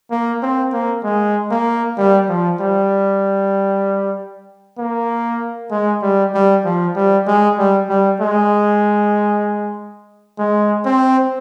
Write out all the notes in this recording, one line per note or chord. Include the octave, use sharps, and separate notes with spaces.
A#3
C4
A#3
G#3
A#3
G3
F3
G3
A#3
G#3
G3
G3
F3
G3
G#3
G3
G3
G#3
G#3
C4